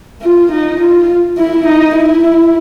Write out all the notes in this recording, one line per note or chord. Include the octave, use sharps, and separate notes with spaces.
F4
D#4
F4
E4
D#4
E4